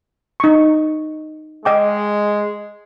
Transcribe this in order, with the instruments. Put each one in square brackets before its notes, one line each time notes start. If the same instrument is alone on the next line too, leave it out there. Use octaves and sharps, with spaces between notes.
[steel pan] D#4 C#6
[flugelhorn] G#3 [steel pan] D#5 G5 D6